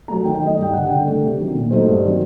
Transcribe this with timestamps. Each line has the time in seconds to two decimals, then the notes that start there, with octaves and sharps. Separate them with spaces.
0.08 F#3 A3 A#5
0.24 D#3 G5
0.35 G5
0.40 A3 D#4
0.46 D#5
0.57 G2
0.62 G5
0.73 D3 G3 F#5
0.90 D3 G5
1.06 A3 D4
1.22 C3
1.39 D#3 F#3
1.55 A#2
1.71 F#3 A3 D#4 C5
1.88 G2
2.04 D#3 F#3 C4